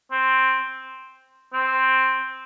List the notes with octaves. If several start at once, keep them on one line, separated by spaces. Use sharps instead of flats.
C4
C4